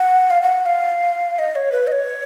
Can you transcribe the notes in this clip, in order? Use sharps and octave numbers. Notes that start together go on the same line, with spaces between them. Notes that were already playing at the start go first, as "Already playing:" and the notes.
Already playing: F#5
F5
F#5
F5
D#5
C#5
B4
D#5
C#5